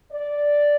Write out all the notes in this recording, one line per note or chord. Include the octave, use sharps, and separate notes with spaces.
D5